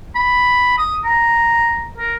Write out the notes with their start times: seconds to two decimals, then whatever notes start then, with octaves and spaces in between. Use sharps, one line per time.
0.15 B5
0.78 D#6
1.05 A#5
1.98 A#4